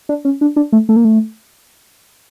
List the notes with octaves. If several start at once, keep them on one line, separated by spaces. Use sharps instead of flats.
D4
C#4
D4
D4
A3
A3
A#3
A3